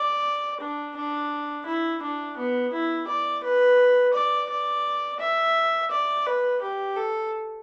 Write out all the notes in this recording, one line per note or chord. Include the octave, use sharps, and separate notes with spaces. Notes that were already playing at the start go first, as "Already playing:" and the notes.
Already playing: D5
D4
D4
E4
D4
B3
E4
D5
B4
D5
D5
E5
D5
B4
G4
A4